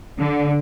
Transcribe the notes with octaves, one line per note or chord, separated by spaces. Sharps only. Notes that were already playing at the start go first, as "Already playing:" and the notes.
D3